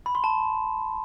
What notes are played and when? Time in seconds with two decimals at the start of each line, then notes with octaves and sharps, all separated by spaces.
0.06 B5
0.15 C6
0.24 A5